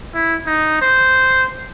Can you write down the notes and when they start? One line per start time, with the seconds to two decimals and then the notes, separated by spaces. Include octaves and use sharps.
0.15 E4
0.46 D#4
0.82 C5